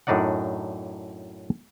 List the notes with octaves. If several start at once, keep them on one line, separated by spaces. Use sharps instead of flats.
F#2 A2 D4 D#4 D5 F#5